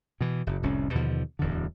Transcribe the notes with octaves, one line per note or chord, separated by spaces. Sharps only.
B2 E3
F#1
F1 C2 A2 C#4
D#2 B2 D3 F3
D1 E2 D3